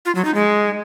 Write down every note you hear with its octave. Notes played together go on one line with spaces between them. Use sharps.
F4
F#3
D#4
G#3